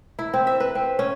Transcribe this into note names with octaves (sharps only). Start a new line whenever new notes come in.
E4
C4
E5
B4
C4
C#4